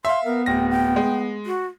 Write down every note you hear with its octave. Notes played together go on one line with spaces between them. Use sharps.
E5 F5 C6
B3 A#4
D1 G5 A#6
G5
G#3
F#4